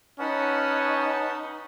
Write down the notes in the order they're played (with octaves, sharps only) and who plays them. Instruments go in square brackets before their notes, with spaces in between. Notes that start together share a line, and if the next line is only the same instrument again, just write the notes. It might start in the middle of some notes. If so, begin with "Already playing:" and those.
[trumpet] C#4 [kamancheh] D#4 [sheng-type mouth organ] B4 F#5 A5